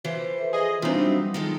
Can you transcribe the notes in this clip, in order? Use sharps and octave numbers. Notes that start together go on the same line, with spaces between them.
E3 F3 C5
A4 B4 E5
G#4 D#5
E3 G3 C4 D4 D#4 F4 F#4
F#3 G3
D#3 G#3 A4